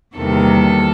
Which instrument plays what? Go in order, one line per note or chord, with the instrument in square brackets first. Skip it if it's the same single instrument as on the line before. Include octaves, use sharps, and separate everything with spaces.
[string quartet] E2 C3 D#3 G3 A#3 A4